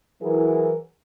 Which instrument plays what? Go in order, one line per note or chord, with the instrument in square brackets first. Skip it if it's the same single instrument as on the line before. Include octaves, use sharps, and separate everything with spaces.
[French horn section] E3 F#3 E4 G#4 A#4